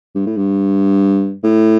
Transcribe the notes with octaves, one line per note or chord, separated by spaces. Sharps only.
G2
A2
G2
A2